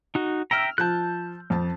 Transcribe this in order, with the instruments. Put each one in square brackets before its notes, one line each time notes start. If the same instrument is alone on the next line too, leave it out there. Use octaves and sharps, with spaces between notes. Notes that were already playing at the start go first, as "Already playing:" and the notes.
[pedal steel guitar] D#4 F#4
[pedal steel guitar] E5 G5 A#5 [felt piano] E6 F6
[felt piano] F3 G6 [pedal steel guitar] A5 F#6
[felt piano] F2 A5